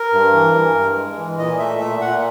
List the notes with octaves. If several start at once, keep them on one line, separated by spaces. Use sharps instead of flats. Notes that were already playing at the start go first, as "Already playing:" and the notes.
Already playing: A#4
G2
E3
G2
G2
G#3
E3
A#2 D#5
A3 E5
A#2 E5
A#2 F#5